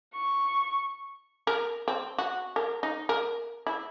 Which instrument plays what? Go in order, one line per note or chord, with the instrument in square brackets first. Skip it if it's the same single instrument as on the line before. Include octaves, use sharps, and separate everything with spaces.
[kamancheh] C#6
[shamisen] A#4
C4
F#4
A#4
D#4
A#4
E4